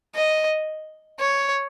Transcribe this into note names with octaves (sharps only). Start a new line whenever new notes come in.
D#5
C#5